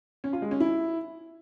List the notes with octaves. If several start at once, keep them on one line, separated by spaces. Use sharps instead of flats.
C#4
F4
G#3
C#4
E4